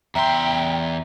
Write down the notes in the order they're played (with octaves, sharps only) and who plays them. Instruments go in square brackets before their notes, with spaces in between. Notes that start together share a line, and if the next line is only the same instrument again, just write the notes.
[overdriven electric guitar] E2 C6 [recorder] E5 [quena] G5 [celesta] A#5